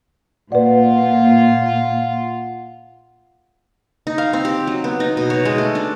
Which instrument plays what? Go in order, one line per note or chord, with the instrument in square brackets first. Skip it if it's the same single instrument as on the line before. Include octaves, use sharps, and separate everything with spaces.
[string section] A#2 [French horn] F4 [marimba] B4 D5 [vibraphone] F#5
[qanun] D#4
F5
C4
G4
F#3
B3
D#4
B2
C#5
G#3
A3
D4